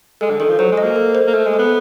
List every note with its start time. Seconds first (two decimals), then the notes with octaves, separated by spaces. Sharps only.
0.21 G#3 A4
0.30 D3
0.39 D#3 A4
0.49 F3
0.59 F#3 C5
0.72 G#3
0.77 D#5
0.83 A#3
0.96 A4
1.15 C5
1.27 A#3
1.34 A3 A4
1.46 G#3
1.54 A4
1.59 B3